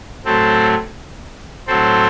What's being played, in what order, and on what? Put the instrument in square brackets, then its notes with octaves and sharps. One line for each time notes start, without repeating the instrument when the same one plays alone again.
[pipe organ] A2 F#3 A3 C4 A4 C5
A2 F#3 C4 A4 C5